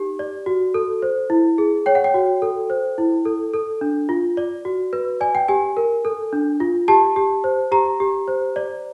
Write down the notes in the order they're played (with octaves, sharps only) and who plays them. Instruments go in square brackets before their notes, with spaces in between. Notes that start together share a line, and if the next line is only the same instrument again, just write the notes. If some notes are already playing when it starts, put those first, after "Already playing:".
Already playing: [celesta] D#4 G4
D5
F#4
A4
C5
E4
G#4
C#5 G5
F#5
G5
F#4
A4
C5
E4
A4
A4
D4
F4
D5
F#4
B4
D5 G#5
G5
G4 G#5
A#4
A4
D4
F4
G4 A5
G4
C5
G4 A#5
G4
C5
D5